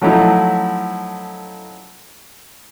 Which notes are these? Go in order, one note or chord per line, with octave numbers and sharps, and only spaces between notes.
F3 F#3 A3 C#4 D#4 E4